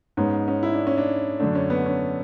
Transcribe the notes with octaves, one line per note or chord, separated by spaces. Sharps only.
G#2 G#3 B3 C#4
C#4
E4
D4
C#4
D4
F#2 D3 A3 D4
C#4
B3
C#4